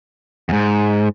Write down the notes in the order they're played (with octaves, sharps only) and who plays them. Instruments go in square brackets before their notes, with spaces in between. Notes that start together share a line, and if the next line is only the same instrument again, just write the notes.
[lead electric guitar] E2 G#2